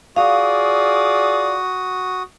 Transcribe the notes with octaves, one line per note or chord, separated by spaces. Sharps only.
F4 F#4 G#4 D5 F5 D#6